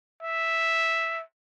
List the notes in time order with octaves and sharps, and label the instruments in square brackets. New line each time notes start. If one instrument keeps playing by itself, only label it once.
[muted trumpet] E5